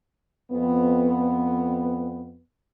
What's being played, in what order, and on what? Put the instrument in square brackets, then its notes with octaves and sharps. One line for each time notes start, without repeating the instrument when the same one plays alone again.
[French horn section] F2 B3